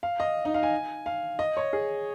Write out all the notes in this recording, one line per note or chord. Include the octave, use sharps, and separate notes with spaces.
F5
D#5
D#4
F5
G#5
F5
D#5
C#5
G#4